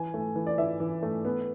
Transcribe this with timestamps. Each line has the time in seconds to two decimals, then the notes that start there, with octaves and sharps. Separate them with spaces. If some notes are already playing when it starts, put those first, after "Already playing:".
Already playing: E3 G#5
0.14 A3
0.36 E3
0.47 D5
0.58 E3 E5
0.80 E3
1.03 A3
1.25 B3